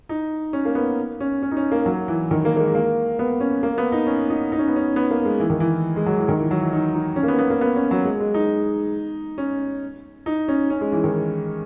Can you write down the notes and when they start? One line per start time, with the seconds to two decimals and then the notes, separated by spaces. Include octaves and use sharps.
0.09 D#4
0.53 C#4
0.65 A#3
0.75 B3
1.20 C#4
1.43 C#4
1.51 D#4
1.57 C#4
1.71 A#3
1.86 F#3
2.08 E3
2.31 D#3
2.45 A#3
2.56 A#3
2.60 G#3
2.75 A#3
3.19 B3
3.40 C#4
3.63 A#3
3.78 B3
3.92 D#4
4.07 C#4
4.30 D#4
4.52 D#4
4.59 C#4
4.68 B3
4.76 C#4
4.96 B3
5.11 A#3
5.25 G#3
5.40 E3
5.50 D#3
5.60 E3
5.96 G#3
6.06 F#3
6.18 E3
6.29 D#3
6.39 E3
6.51 F#3
6.61 E3
6.73 D#4
6.95 D#4
7.16 C#4
7.23 A#3
7.28 B3
7.39 B3
7.50 A#3
7.61 B3
7.76 C#4
7.91 F#3
8.05 G#3
8.20 G#3
8.34 D#4
9.38 C#4
10.26 D#4
10.48 C#4
10.70 C#4
10.81 G#3
10.92 E3
11.04 D#3